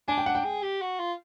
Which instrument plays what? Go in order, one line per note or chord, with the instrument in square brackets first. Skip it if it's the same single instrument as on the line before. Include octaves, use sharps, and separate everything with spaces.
[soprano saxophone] D4 [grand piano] G#5
[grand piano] G5
[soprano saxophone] D4 [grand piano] F#5
[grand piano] G5
[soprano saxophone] G#4
G4
F#4
F4